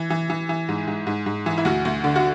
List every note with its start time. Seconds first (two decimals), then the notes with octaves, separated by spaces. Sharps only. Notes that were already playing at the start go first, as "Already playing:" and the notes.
Already playing: E3
0.10 E3
0.30 E3
0.49 E3
0.69 G#2
0.87 G#2
1.07 G#2
1.26 G#2
1.46 E3
1.58 E4
1.65 D2 F#4
1.85 D2
2.04 D3
2.16 F#4